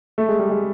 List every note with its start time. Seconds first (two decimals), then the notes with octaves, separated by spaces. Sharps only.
0.18 A3
0.28 G#3
0.39 G3
0.50 G#3